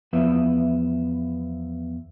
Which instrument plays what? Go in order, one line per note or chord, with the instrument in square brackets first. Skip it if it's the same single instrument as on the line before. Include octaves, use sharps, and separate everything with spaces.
[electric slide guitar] E2 F3 B3 B4 E5